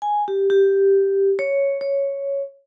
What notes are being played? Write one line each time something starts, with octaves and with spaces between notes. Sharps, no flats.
G#5
G4
G4
C#5
C#5